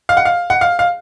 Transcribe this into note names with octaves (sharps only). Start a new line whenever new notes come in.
F5
F#5
F5
F#5
F5
F5